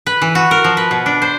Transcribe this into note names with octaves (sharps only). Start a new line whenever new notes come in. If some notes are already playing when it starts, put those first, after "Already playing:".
B4
E3
F#4
A#4
F3
B4
B2
D4
C5